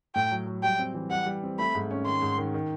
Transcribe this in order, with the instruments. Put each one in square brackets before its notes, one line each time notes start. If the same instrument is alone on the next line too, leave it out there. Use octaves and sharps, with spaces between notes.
[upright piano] A2 [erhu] G5
[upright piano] F#3
F#3
[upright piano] G3 [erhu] G5
[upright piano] C4
E3
[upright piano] G3 [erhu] F#5
[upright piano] G3
C4
[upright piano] A3 [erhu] B5
[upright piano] G#2
C#4
[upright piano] D#3 [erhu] C6
[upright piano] G#2
D#3
D#3